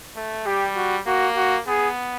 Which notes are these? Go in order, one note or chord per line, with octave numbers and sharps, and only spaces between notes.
A3
G3 G4
F#4
A#3 F#4
F#4
B3 G#4